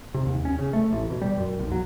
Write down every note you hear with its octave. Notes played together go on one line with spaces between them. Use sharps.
C3
D#2
C#4
C#3
A3
A1
B2
G3
F#2
B1
F#3